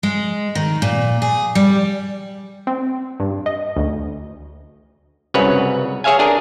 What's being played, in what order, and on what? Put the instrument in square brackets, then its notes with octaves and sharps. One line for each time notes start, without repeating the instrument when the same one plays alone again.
[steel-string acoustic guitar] G#3
D#3
A#2
G#4
G3
[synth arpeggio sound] C4
G2
D#5
D2
[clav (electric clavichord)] C2 F#2 C#3 F#3 B4 C#5
G#4 C#5 E5 F5 G#5
D4 G#4 A#4